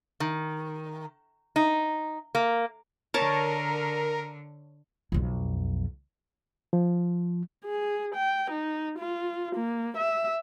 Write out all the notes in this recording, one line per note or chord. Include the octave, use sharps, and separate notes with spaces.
D#3
D#4
A#3
D3 A#4 C#5 A5
B1 F2
F3
G#4
G5
D#4
F4
A#3
E5